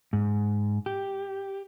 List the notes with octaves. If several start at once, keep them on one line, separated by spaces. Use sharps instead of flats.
G#2
G4